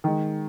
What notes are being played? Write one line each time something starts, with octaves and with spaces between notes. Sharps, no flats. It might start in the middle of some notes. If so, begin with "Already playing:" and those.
D#3 G#3